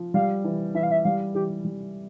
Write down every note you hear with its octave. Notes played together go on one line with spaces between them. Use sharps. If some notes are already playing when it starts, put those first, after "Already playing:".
Already playing: F3
G3 F5
E3
E3 E5
F5
E5
G3 F5
E3 G4
G3